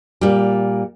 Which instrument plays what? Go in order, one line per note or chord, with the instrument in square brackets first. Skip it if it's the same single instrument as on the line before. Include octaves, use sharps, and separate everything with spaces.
[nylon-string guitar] A#2 G3